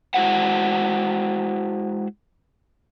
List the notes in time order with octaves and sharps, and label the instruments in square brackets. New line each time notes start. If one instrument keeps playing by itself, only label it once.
[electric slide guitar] G#3 E4 F#4 C5 F#5